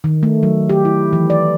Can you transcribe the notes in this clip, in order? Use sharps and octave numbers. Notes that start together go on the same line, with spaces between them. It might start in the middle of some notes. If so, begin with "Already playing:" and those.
D#3
A3
F#3
G4
E4
E3
D5